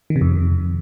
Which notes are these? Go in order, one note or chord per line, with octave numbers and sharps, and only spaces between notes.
D#3
C3
F2